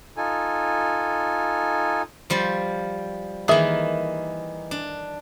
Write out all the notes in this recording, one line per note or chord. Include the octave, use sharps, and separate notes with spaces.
D#4 F4 A4 G#5
F3 G3 C5
D#3 E3 A#3 G#4 E5
D4